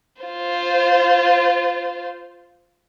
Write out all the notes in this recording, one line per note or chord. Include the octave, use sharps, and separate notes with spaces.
F4 C5